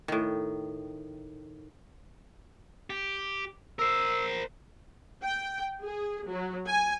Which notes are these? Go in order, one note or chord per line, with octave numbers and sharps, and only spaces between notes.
A2 D#3
G4
A#4 C5 E6
G5
G#4
F#3
G#5